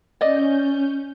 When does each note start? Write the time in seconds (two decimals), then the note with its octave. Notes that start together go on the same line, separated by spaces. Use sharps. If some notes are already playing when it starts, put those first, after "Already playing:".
0.21 C#4 D5 D#5 G6